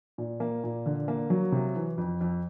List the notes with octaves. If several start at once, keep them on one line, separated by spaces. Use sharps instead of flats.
A#2
A#3
A#2
D3
A#3
F#3
C3
E3
F2
F2